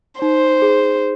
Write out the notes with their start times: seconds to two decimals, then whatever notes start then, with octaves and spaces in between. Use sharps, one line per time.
0.21 D#4 C5
0.62 G#4